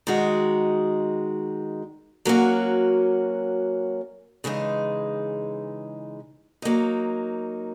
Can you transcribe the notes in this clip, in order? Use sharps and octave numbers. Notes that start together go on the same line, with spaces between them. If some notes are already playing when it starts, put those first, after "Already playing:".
D#3 G#3 D#4 F#4
F#3 A#3 C#4 F#4
C#3 E3 G#3 D#4
F#3 A#3 D#4